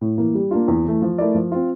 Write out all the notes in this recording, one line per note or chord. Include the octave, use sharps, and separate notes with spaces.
A2
E3 A#3
G3
A#3 D4 F4
E2
E3 A3
F3
A3 E4 A#4 D5
F3
C4 F4